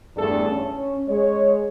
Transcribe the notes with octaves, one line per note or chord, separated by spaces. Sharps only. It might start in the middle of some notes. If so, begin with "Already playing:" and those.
E2 G2 A3 D4 A4
C#4
G#3 C#5